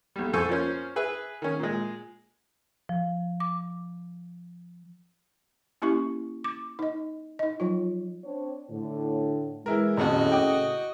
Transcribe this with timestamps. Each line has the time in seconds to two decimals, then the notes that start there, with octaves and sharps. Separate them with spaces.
0.16 B1 G3
0.33 F2 A4 C5 G#5 C#6
0.49 F3 A#3 C#4 C5
0.96 G#4 B4 E5
1.42 D#3 C#4
1.59 A#2 G#3
2.89 F3
3.40 D6
5.82 A#3 C#4 E4 G4 C#6
6.44 D6
6.79 D#4 D#5
7.39 D#4 D#5
7.60 F3 F#3 F4
8.24 C4 D4 C#5
8.70 A2 D3
9.66 E3 G#3 E4 A#4
9.97 D#1 F2 A2 C#3 F#4 D#5
10.32 G5 D6 D#6